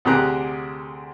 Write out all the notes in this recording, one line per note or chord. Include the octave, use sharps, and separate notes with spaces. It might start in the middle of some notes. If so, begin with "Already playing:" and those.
D2 C3 G4 G#4 A#5 F#6